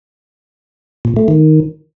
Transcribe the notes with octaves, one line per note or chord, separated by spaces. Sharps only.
A#2
A3
D#3